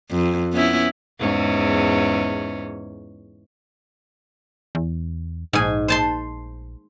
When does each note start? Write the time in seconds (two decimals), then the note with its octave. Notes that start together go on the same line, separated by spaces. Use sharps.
0.11 F2
0.52 B3 C#4 E4
1.20 E2 G#2 C#4
4.75 E2
5.53 A#1 G#2 G#5
5.88 C5 A5 C6